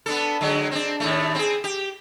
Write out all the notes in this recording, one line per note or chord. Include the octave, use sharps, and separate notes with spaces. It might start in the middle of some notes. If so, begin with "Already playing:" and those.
B3 D4 A4
D3 F#3 G#3
C4 D4
D#2 A2 A3
C4 G#4
G4